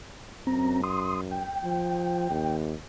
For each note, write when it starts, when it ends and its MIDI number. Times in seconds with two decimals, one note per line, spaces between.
0.47 1.44 42
0.47 0.81 60
0.47 0.81 82
0.84 1.21 84
0.84 1.21 87
1.31 2.57 79
1.64 2.28 53
2.30 2.75 39